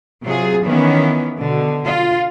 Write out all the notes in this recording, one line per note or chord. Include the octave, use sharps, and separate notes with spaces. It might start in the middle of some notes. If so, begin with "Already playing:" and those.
C3 F#3 F4 G#4
D#3 E3 B3 C#4
B2 D3
F4